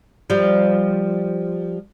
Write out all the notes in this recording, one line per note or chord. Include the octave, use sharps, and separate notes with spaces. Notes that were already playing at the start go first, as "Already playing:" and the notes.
F3 G3